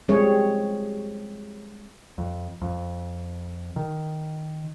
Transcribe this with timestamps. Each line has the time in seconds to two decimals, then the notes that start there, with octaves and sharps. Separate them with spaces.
0.08 F3 G3 G#3 C4 G#4 C#5
2.18 F2
2.62 F2
3.76 D#3